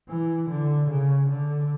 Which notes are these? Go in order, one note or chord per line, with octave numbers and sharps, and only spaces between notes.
E3
D3
C#3
D3